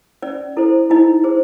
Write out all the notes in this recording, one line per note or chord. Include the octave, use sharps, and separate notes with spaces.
C#4 D5
E4 A4 C5
D#4 E4 D#5
G#4 C5